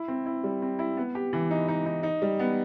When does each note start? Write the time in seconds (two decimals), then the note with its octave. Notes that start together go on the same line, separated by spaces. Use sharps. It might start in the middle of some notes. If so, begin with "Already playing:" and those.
Already playing: E4
0.08 C4
0.26 E4
0.44 G3
0.62 C4
0.79 E4
0.97 B3
1.15 G4
1.33 E3
1.51 D#4
1.68 D#4
1.86 D#4
2.03 D#4
2.22 G3
2.39 B3